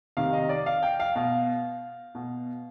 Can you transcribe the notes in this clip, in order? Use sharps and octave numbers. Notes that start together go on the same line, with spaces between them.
C3 D#3 F5
D#5
D5
F5
G5
F5
B2 F5
B2